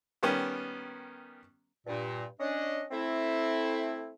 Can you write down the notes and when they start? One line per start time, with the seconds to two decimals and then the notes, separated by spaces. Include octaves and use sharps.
0.23 D#3 G3 B3 C#4
1.87 G2 A#2
2.39 C#4 D4 D#5
2.92 A3 C4 E4